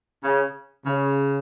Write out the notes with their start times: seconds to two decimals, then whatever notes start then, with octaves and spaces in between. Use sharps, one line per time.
0.23 C#3
0.85 C#3